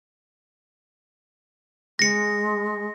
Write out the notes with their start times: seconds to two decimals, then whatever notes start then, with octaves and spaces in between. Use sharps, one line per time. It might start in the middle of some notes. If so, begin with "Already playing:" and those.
1.99 G#3 A#6 C#7